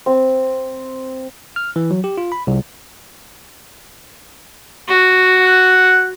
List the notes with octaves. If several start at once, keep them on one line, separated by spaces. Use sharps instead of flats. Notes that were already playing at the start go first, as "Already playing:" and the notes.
C4
F6
E3
F#3
G4
F4
B5
C2
F#4
F#5